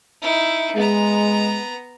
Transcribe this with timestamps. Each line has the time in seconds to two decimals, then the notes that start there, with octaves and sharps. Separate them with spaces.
0.22 D#4 E4
0.76 G#3 B3 A#5